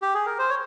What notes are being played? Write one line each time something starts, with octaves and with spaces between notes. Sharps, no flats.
G4
G#4
A#4
C5
C#5